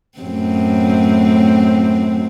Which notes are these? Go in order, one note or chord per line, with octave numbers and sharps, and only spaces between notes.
F#2 A2 C4